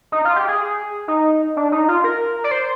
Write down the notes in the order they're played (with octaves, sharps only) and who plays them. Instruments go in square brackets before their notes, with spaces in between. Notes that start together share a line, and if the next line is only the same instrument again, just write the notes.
[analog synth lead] D#4
F4
G4
G#4
D#4
D4
D#4
F4
A#4
D5
C5